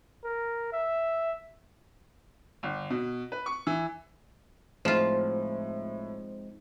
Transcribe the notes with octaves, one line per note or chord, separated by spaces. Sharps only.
A#4
E5
G1
B2
B4
C#6
E3
A2 F3 G#3 C4 D#4 F4 C5